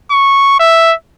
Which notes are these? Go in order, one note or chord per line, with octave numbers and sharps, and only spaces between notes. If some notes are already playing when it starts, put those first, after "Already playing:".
C#6
E5